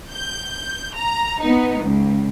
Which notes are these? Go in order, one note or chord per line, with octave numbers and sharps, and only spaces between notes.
G6
A#5
B3 D#4
C#2